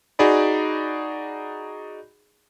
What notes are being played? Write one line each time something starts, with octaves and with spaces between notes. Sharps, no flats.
D#4 F#4 G#4 D5 B5